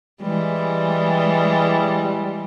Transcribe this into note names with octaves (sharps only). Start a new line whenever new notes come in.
E3 G3 G#3